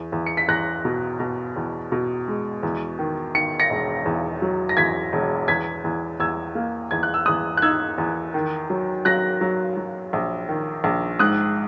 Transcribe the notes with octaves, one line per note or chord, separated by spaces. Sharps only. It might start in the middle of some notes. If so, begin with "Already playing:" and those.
Already playing: E2
E2
C#7
B6
E2 F#6 A#6
B2
B2
E2
B2
G#3
E2
D#3
D#3 C#7
A#6 C#7
E1
E2
F#3
A#6
E2 G#6 B6
E1
E2 G#6 B6
E2
E2 E6 G#6
A#3
E2 G#6
F#6
E6
E2 D#6 F#6
F#6
D#4 E6 G#6
E2
D#3
F#3
F#3 F#6 A#6
F#3
F#3
A#1
D#3
A#1
G#2 D#6 F#6